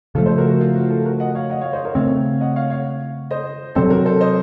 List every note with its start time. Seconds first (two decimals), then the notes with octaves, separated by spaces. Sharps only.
0.15 C#3 F3 A3 F4 A4
0.26 A4 C5
0.37 F#4 A#4
0.50 F#4
0.61 F4
0.75 F#4
0.90 F4 A4
1.05 F#4 A#4
1.20 D#5 F#5
1.35 C#5 F5
1.50 D#5 F#5
1.61 C#5 F5
1.73 C5 D#5
1.85 A#4 C#5
1.95 C#3 A3 C4 C#5 F5
2.40 D#5 F#5
2.56 C#5 F5
2.70 C#5 F5
3.31 C5 D#5
3.75 C3 F#3 C4 A4 C5
3.90 F#4 A#4
4.06 A4 C5
4.21 C5 D#5